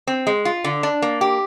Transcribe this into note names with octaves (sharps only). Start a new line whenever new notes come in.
C4
G#3
F4
D3
D4
A#3
G4